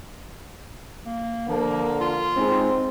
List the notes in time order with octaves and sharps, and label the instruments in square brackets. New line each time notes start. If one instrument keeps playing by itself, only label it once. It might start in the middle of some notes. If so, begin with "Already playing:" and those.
[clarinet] A#3
[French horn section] D3 A#3 A4 [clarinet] F3
[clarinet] F4
[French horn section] G#3 D#4 [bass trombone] C4